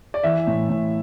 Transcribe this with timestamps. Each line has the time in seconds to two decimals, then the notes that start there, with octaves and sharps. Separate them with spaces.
0.14 D5
0.23 E3 E5
0.47 A2
0.69 A2